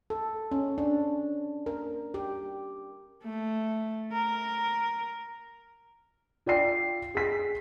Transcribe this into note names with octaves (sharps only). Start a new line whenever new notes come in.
A4
C#4
D4
A#4
G4
A3
A#4
F4 D5 G5 C7
G#4 B6